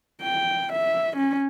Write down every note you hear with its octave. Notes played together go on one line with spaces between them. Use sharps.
G5
E5
C#4